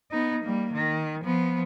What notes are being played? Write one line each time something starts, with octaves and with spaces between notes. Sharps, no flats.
B3 D#4
G3 A#3
D#3
F3 B3